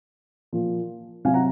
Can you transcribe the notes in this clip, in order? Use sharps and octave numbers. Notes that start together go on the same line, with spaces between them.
A#2 F3
C3 F#3 F5 G#5
F#5 A#5